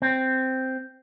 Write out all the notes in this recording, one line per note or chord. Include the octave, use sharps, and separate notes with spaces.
C4